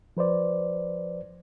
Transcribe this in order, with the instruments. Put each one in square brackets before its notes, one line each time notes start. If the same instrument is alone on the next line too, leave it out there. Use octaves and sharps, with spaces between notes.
[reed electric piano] F3 B4 C5 D5